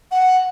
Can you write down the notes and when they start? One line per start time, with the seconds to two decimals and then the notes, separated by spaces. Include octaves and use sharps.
0.11 F#5